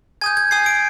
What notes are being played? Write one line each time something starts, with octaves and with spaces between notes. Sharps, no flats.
G#5 D#6 G6 G#6
G#6
G#5 D#6 G6 C7
D7